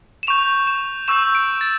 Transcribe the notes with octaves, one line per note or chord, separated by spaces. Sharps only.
E7
C#6 G6 F7
E7
C#6 E6 G6 E7
D7
A6